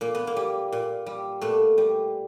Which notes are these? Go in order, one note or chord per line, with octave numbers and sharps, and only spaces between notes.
A#2 A#3
B3
A#3
G3
A#2
G3
A#2 A3 B3
G3